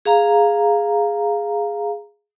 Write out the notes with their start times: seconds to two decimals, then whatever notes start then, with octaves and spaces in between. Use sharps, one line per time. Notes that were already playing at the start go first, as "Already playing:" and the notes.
0.06 G#4 F5 A#5